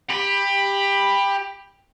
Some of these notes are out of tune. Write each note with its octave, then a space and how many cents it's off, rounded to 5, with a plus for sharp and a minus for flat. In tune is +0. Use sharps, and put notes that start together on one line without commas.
G4 +20 B5 +0